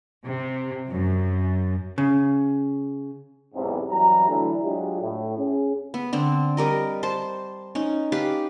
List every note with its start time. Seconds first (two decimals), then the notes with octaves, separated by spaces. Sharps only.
0.22 C3
0.90 F#2
1.98 C#3
3.55 B1 E2 G#2 C3
3.91 F#2 E3 F#3 G3 A#5
4.28 D3 E3 F#3 A3 D4 E4
4.63 F#3 G#3 D4 F4 G4
5.01 A2
5.37 C#4 G#4
5.94 B3
6.13 D3 C4
6.57 G3 A#4 D#5
7.03 C5 A5 C6
7.75 C#4 D#4
8.12 G4 B4 F5